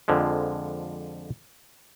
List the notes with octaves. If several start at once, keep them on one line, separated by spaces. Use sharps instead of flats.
F2 D3 F3 G#3